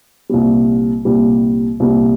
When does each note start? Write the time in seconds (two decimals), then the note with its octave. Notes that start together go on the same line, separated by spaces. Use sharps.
0.30 C2 A#2 G3
1.05 C2 A#2 G3
1.80 C2 A#2 G3